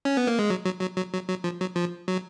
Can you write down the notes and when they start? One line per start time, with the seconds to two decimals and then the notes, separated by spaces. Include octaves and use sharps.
0.05 C#4
0.17 B3
0.27 A#3
0.39 G#3
0.50 F#3
0.65 F#3
0.81 F#3
0.97 F#3
1.14 F#3
1.29 F#3
1.44 F3
1.61 F#3
1.76 F3
2.08 F#3